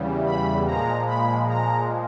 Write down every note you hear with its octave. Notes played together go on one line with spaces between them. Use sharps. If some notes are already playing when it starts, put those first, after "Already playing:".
Already playing: E2 C#3 E3 G3
B5
A#2 F3 G#3 A#5
B5
A#5